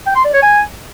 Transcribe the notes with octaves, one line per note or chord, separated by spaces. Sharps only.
G5
C6
D5
C#5
G#5